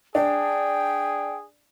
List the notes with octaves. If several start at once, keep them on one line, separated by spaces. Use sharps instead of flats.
D4 G#4 G5